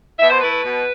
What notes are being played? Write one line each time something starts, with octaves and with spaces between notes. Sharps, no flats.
B2 E5
C5
A3 E4 B4
B4
B2